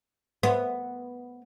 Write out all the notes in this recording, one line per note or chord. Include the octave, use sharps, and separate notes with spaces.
B3